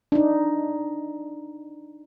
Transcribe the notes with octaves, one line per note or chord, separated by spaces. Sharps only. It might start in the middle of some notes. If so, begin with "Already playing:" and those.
D4 D#4